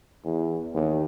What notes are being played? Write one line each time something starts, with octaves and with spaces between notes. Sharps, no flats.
E2
D#2